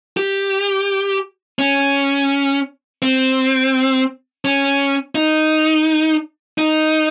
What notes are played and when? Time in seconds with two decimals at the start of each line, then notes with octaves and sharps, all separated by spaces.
0.17 G4
1.59 C#4
3.02 C4
4.45 C#4
5.15 D#4
6.58 D#4